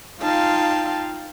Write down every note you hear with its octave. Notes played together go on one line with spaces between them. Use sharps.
D#4 F4 F5 G5 A5